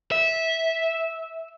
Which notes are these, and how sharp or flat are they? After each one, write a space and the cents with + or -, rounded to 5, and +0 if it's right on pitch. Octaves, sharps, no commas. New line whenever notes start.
E5 -15